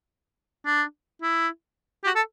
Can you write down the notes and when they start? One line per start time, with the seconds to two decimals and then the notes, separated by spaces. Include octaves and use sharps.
0.65 D4
1.22 E4
2.04 G4
2.07 F#4
2.16 A4